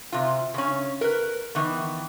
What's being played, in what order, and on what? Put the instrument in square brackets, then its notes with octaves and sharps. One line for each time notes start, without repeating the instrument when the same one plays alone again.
[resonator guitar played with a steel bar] C3 F4
C#3 C#4
A#4 B4
D#3 E3 B3